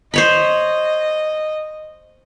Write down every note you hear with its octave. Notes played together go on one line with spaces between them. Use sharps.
C5 C#5 D#5 B5